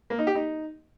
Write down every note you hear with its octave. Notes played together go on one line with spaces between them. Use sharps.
A#3
D#4
G4
D#4